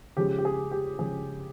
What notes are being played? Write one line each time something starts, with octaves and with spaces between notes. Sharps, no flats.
C#3 F3 G#3 G4
G4
G#4
G4
C#3 F3 G#3 G#4